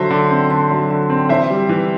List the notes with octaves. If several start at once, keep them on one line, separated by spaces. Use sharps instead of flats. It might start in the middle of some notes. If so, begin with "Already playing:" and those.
Already playing: D3 F#3 C5 E5
D3
C4
D3
F#3
D3
C4
E3 C5 E5
G3
E3